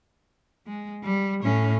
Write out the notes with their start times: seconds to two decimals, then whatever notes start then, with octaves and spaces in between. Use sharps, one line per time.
0.67 G#3
1.04 G3
1.43 A2 C#4